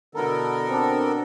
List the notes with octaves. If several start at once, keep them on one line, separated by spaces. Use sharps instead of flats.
B2 D3 B3 E4 A4 A#4 A#5
C4 D4 G4